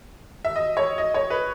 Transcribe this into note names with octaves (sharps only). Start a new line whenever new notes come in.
E5
D#5
C#5
D#5
C#5
B4